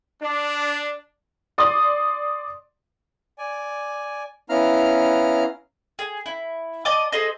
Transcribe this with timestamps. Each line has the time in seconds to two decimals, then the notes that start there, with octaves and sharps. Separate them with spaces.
0.22 D4
1.58 D5 C6 D#6
3.38 D5 G#5
4.49 B3 C#4 E4 F5 A#5 F6
5.99 G#4
6.26 E4
6.85 D5 D#5 A5 D6
7.12 G#4 A4 C5 D#5